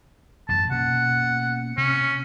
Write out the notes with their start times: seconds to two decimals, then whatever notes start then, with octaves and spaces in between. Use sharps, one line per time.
0.49 A1 F#2 A5
0.71 B2 A#3 C#4 F#5
1.77 C3 C#4